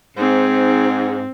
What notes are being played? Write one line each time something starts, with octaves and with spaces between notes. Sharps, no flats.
G#2 C4